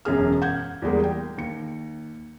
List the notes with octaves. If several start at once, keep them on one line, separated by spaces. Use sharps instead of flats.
E1 F#2 C#4 G#4 F6
F#5 G6 G#6
E2 G3 G#3 A#3
G5
D#2 C#7